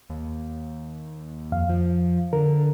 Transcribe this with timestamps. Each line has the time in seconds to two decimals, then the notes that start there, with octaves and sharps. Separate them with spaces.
0.10 D#2
1.52 F2 F5
1.69 F3
2.33 D3 A#4